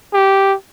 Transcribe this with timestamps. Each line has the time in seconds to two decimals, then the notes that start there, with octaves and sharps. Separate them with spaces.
0.14 G4